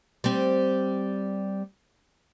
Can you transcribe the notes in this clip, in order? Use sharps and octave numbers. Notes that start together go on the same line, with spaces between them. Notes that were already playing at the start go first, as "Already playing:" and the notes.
G3 C4